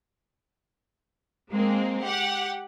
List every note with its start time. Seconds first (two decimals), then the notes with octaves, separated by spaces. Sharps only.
1.52 G#3 A#3 C4
2.03 G4 F#5